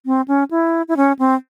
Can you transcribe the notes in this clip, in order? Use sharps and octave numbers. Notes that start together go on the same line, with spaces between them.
C4
C#4
E4
E4
C#4
C4